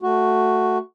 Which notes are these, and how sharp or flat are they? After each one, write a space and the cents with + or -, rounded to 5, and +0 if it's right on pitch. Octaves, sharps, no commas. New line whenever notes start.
A3 +0 F#4 +0